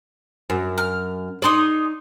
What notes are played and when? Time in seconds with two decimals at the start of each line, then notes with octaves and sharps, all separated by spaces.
0.50 F#2
0.78 F6
1.42 D#4 G#4 D5 C6 D#6